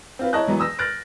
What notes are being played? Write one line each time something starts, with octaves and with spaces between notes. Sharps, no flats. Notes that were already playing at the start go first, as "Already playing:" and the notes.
C4 F4 B4
E4 A#4 C#5 D#5 A5 F#6
E3 F#3 B3
D#6 E6 A#6
F6 F#6 A6 A#6 D7